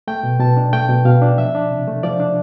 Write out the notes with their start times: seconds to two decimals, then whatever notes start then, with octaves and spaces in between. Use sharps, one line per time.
0.08 A3 G5
0.23 B2
0.40 B2 A5
0.57 D4
0.73 A3 G5
0.89 B2
1.05 B2 F5
1.22 D4
1.38 F3 E5
1.55 D4
1.71 C3
1.87 A3
2.03 F3 D5
2.20 D4